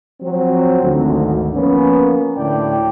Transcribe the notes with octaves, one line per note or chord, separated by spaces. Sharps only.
F3 F#3 C4
G#1 D2
F3 A#3 B3 C#4
D2 A2 D5 G5